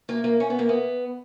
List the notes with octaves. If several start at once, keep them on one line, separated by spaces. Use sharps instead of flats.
A#3
A#3
C#4
B3
A#3
B3